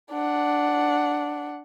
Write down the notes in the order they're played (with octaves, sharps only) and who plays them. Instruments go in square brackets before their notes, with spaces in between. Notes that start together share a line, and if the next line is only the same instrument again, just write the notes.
[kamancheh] D4 F#5